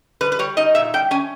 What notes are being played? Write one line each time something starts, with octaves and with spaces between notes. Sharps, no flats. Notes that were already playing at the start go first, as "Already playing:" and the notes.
G3 B4
B4
G3 C#5
D#4 D#5
A#2 E5
G3 G5
C#4 G#5